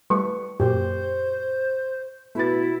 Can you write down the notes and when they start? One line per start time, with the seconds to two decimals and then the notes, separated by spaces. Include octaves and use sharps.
0.10 G3 A3 B4 C#6
0.60 F#2 A#2 G4 C5
2.35 B2 A3 E4 B4 A6